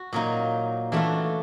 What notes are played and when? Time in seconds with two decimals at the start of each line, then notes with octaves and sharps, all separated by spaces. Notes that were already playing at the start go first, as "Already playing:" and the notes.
Already playing: F#4
0.13 A#2 F#3 A#3 D#4
0.92 E3 A3 D4 F4 F#4